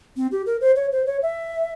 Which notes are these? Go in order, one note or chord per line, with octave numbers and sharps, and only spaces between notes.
C4
G4
A#4
C5
C#5
C5
C#5
E5